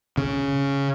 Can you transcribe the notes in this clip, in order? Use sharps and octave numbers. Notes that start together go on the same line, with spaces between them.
C#3